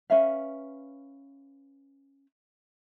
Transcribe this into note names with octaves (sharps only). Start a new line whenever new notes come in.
C#4 B4 E5 F5